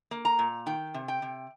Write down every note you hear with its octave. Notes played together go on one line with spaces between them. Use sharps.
A#3
A#5
A#2
D#3 G5
C3
G5
C3